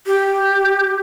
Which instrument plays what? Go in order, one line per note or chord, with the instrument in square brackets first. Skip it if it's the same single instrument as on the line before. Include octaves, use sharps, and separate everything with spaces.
[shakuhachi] G4